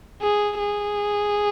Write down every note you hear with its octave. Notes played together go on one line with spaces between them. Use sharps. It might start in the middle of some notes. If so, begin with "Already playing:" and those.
G#4
G#4